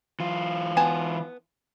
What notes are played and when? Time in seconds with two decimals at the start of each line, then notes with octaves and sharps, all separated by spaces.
0.20 E3 F4
0.77 B3 G#5 A5